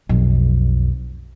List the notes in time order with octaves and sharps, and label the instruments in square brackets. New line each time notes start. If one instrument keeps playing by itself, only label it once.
[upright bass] B1 F2